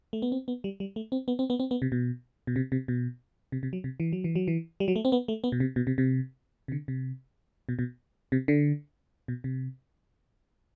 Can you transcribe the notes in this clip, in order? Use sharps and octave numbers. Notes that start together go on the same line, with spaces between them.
A3
B3
C4
B3
G3
G3
A3
C4
B3
C4
B3
C4
B3
C3
B2
B2
C3
C3
B2
C3
C3
F#3
C3
E3
F#3
E3
F#3
E3
G3
F#3
A3
C4
B3
A3
B3
B2
C3
B2
C3
C3
C3
D3
C3
B2
B2
C3
D3
B2
C3